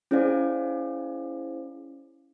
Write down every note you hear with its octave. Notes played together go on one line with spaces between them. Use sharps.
C#4 E4 G#4 C5 D5 F5